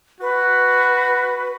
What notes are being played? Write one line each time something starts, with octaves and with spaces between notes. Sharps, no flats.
F#4 B4